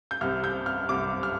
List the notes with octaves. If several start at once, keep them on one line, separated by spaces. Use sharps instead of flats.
G6
C2 C3 F6
G6
F6
C2 C3 D6
F6